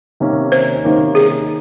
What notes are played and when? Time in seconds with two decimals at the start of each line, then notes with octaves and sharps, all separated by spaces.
0.20 C3 D#3 A#3 C#4
0.52 C5
0.84 C3 D#3 A#3 C#4
1.15 G#4